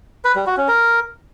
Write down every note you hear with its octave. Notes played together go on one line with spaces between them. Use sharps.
B4
G3
F#4
C#4
A#4